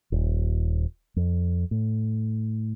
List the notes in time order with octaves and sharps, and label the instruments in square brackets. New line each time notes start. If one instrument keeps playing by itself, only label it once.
[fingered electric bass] D#1
F2
A2